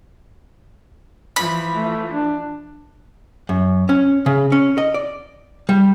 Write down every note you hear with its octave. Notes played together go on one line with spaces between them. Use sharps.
E3 F3 B5
A3
D4
F#2
C#4
C#3
C#4
D#5
D5
G3